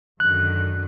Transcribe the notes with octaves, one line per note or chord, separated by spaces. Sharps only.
F#2 D3 D#3 F#6